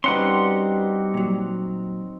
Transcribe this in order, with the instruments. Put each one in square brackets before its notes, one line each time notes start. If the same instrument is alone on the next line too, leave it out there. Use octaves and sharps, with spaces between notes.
[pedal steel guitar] G3 F#5 C6 [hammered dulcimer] C4 D#4 F#4 [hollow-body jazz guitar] C#4 B4
[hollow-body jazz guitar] A#2 F#3